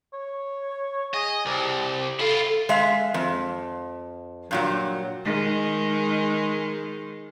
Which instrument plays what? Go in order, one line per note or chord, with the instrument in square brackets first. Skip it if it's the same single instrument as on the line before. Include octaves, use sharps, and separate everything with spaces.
[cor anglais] C#5
[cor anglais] G#4 [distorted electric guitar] D#5
[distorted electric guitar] C2 [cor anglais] G4
[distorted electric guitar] E4 F4 [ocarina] A4
[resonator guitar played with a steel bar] G#3 E5 F5
F2
G2 A#2 F#3
[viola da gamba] D#3 G#3